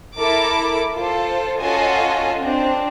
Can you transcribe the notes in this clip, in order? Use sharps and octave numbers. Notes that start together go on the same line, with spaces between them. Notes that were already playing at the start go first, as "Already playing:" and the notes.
E4 A4 A#4 D6
F4 A4 C5
C#4 F4 F#4 A4 D#5 G#5
C4 D4